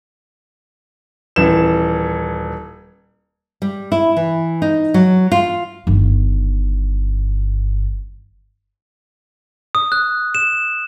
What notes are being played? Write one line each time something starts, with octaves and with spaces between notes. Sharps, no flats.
D#1 E3 E7
G3
E4
E3
D#4
F#3
F4
G1 D#3
D#6
F#6
E7